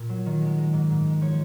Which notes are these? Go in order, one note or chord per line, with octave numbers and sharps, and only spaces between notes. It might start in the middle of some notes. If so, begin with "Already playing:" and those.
Already playing: A#2 A#4
F#3
D#3
G#3
G#3
G#2
G#2
G#3
F3 C#5